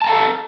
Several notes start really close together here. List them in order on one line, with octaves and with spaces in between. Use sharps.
A5 A#5 F5 A4